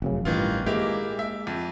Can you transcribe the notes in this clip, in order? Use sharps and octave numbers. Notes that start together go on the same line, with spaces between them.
F1 F#2 C#3
A1 G2 D#3 E3 F4
G#3 A#3 E4 G4
E5
F2